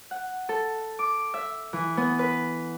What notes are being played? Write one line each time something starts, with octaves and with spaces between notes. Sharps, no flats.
F#5
A4
D6
E5
E3
B3
B4